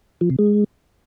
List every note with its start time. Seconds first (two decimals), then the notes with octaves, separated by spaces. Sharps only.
0.21 F3
0.30 C3
0.39 G#3